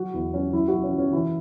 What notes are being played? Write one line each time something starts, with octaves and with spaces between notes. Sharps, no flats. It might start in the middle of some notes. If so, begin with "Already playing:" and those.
Already playing: F#3 F#4
E2 E4
F#3 C#4
F#2 E4
F#4
F#2
C#4
F#2
C#4
E3 E4